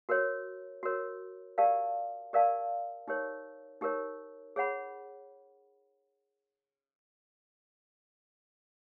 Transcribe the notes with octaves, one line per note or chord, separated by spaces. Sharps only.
F#4 A#4 C#5
F#4 A#4 C#5
G4 A#4 D5 F5 A5
G4 A#4 D5 F5 A5
D#4 G4 A#4 C#5
D#4 G4 A#4 C#5
G#4 C#5 F#5 B5